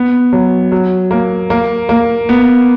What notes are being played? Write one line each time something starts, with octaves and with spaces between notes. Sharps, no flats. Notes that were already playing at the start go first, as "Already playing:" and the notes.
Already playing: B3
F#3
F#3
A#3
A#3
A#3
B3